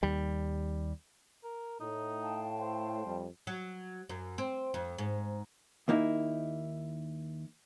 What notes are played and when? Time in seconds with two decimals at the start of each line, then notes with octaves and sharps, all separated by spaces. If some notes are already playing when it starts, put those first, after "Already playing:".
0.03 D#2 G3
1.44 A#4
1.81 A2 D#4
2.23 F5 G5 A5
2.61 C5
3.06 F2 G3
3.47 F#3
4.09 F#2
4.38 C4
4.74 F2
4.98 G#2
5.88 D#2 A#3 D#4 E4